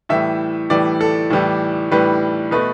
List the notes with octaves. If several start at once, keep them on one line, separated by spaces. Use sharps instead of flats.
A2 E3 G3 E5
A2 E3 G3 D5
A4
A2 E3 G3
A2 E3 G3 B4
B2 A3 B4